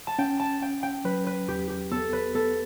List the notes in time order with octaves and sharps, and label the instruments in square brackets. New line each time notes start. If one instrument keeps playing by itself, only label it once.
[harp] A5
[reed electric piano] C#4 [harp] G5
[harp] A5
[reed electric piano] C#4 [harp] G5
[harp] G5
[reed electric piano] F#3 [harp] B4
[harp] B4
[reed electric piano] E2 [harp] G4
[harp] G4
[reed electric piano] B3 [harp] A4
[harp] B4
[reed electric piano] B3 [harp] A4